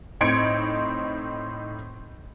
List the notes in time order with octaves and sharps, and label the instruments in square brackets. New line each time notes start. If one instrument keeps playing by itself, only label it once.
[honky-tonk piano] A2 C4 D#4 G#6 C#7 D7